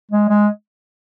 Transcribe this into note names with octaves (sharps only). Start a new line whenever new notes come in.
G#3
G#3